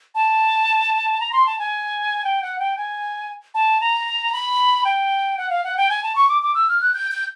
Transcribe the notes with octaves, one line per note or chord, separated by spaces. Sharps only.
A5
A#5
C6
A5
G#5
G5
F#5
G5
G#5
A5
A#5
B5
G5
F#5
F5
F#5
G5
G#5
A5
C#6
D6
D6
E6
F6
F#6
G6
G6